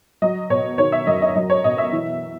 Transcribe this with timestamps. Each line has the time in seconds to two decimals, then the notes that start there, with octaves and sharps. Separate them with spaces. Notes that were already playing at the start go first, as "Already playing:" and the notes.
0.22 F#3 D#5
0.50 B2 C#5
0.78 D#3 C#5
0.92 E5
1.07 F#2 D#5
1.22 D#5
1.36 F#3 D#5
1.50 C#5
1.64 B2 D#5
1.78 E5
1.92 E3